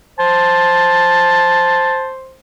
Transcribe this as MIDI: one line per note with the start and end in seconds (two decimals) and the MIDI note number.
0.19 2.38 72
0.19 2.10 81